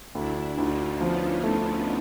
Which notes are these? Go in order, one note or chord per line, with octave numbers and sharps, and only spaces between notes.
D2 D4 E4
D2 D#4 F4
F3 B3 C#4
A3